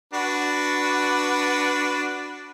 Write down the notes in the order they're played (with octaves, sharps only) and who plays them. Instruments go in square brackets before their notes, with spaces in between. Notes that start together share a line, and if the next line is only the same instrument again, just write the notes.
[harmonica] D4 F#4 B4